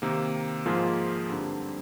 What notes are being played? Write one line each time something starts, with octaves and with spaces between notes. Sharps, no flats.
C3 D#3 A#3
G#2 F3 A#3 F4 G#4
G2 D3 G3 C4 D#4